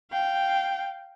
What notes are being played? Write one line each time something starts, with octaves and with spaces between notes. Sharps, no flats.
F5 G5